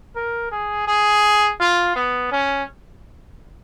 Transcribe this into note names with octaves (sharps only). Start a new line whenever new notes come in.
A#4
G#4
G#4
F4
B3
C#4